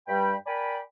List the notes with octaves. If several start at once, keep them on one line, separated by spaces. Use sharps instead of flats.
G2 G3 G5 B5
A#4 D5 G5 G#5 B5